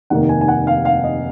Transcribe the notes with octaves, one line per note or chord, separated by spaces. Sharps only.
F1 D#2 D#3 A#3 F#5
G#5
G#5
F#5
F5
F5
D#5